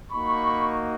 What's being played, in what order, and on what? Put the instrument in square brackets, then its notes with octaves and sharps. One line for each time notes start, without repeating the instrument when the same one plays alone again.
[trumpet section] A#3 D#4 F#4 B5 C#6